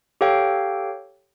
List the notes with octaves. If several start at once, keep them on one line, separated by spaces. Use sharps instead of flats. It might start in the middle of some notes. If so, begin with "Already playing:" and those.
G4 A4 C#5 F5 G5